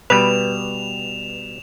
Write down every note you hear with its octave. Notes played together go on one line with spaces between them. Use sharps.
B2 G3 B4 E7 F7